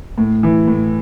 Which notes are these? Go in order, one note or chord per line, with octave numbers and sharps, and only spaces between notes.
A2
E3
A2